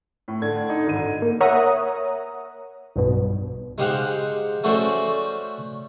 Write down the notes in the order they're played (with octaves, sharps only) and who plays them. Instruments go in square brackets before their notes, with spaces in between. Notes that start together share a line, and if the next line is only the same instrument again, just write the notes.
[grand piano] A2
[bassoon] D3 [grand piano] G#6
[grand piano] D#4
G#1 D3 D#7
[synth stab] A#3
A#4 C#5 E5 F#5 A#5 D#6
B1 G2 B2
[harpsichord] G#3 D#4 G4 C5 F5 F#5
A3 C#4 F#4 C5 D5